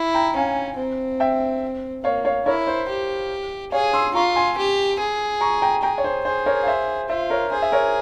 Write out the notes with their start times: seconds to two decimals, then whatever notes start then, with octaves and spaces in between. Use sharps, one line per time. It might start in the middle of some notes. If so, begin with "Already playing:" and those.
Already playing: E4
0.14 G5 A#5
0.35 C#4 F5 G#5
0.78 C4
1.20 E5 G5
2.04 A#3 C#5 F5
2.25 C#5 F5
2.46 E4 A#4 C#5
2.67 C5
2.89 G4
3.72 G#4 C#5 F5
3.93 C6 E6
4.15 F4 A#5 C#6
4.36 G#5 C6
4.57 G4
4.99 G#4
5.41 A#5 C#6
5.62 G5 A#5
5.83 G#4 G5 A#5
5.98 C#5
6.04 C5
6.25 G#4 C5
6.46 A#4 C#5
6.63 F5
6.67 C5 E5
7.09 F4 C5 E5
7.30 A#4 C#5
7.52 G#4 C5
7.62 E5
7.72 A#4 C#5